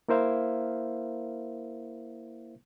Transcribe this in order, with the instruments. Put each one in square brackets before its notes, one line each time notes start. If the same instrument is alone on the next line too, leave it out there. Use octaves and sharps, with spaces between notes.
[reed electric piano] A#3 E4 A#4 C5 E5 F5